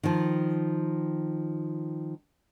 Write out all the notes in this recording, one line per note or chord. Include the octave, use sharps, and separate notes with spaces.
D#3 F3